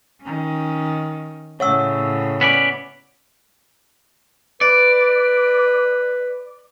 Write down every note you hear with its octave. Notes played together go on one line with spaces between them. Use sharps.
D#3 C#4
A2 C#3 C#5 E5 F#5 E6
B3 C#4 D5
B4 D5